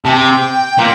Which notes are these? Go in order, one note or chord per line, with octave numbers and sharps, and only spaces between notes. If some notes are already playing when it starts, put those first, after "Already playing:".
C3 G5 A5
A#2